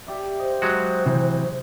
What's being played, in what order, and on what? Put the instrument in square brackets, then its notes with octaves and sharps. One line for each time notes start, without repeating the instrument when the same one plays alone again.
[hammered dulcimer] G4 D5 E5
[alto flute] C5 [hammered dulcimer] D#5
[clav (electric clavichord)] F#3 G#3 F#4
[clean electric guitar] C3 E3